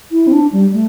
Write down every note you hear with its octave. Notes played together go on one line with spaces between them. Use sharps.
E4
C4
D4
G3
A3